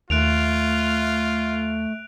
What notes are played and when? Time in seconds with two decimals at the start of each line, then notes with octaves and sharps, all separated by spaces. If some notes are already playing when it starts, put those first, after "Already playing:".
0.10 D#2 A3 F4 F#6 D7 F7